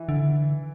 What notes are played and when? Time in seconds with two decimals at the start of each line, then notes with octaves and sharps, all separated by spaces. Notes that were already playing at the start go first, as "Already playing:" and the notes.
Already playing: E3 E4
0.09 D3